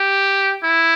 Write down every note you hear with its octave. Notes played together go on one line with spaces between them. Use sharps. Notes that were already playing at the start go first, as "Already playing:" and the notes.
Already playing: G4
E4